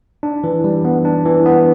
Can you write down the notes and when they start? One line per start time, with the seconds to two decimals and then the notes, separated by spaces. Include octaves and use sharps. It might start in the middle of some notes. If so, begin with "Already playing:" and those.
0.23 D4
0.44 E3
0.64 G3
0.85 B3
1.05 D4
1.25 E3
1.46 B3